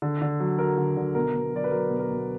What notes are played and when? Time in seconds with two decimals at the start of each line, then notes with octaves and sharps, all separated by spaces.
0.02 D3
0.22 D3
0.40 F#3
0.59 F#3 A#4
0.78 D3
0.97 D3
1.15 B2 A#4
1.35 B2
1.53 F#3 D5
1.64 B4
1.71 F#3 A#4
1.90 B2
1.99 A#4
2.10 B2